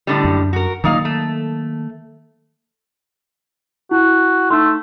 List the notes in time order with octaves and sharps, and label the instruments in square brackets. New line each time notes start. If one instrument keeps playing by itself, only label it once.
[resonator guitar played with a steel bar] A2 D3 G3
[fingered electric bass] F#2
[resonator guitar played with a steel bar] F#4 A#4
[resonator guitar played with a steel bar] A#2 D#4 F5 [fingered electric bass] D#3 F#3 A#3
[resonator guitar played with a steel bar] A3
[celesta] E4 [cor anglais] F#4
[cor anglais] A3 [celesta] D#4 C6